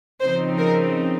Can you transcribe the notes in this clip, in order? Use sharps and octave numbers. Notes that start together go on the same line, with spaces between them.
C#3 F3 C4 D#4 C5
A#4